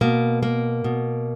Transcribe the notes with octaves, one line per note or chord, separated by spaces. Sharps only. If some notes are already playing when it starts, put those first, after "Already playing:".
B2 A#3
A#3
B2